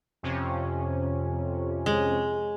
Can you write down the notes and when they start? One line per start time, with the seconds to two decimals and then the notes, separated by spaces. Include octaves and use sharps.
0.23 F2 C3 C#4
1.86 G#3